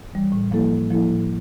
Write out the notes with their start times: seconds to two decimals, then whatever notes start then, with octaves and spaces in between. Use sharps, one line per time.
0.13 E3 G3
0.32 A2
0.51 F3 A#3 E4 A4
0.71 A2
0.90 F3 A#3 E4 A4
1.10 A2